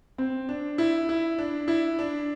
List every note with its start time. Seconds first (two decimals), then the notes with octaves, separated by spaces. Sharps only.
0.18 C4
0.49 D4
0.78 E4
1.09 E4
1.38 D4
1.68 E4
1.99 D4